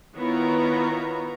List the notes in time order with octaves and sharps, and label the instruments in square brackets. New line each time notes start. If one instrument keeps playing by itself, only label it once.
[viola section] D#3 B3 E4 F4 C#5 A#5